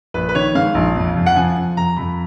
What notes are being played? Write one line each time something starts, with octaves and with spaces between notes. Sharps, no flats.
A#1 B4
B4
D#3 C#5
G#2 F5
A#1
F2
F2
F#5
F3 G#5
F3
F2 A#5
F2 B5